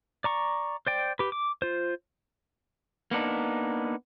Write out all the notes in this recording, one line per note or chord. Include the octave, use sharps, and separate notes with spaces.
D5 A#5 C#6
C5 D5 G5
G4 B4
D6
F4 C5
A#3 B3 D4 D#4